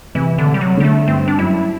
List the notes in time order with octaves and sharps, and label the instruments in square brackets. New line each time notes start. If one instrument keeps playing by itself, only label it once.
[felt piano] C3 [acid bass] E3
[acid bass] D3
[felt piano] C3
[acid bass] G3
F#3
[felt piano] D3 [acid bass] G3
[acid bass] A3
[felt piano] G2 [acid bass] C4
[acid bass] D4
[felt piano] F#2 [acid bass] E4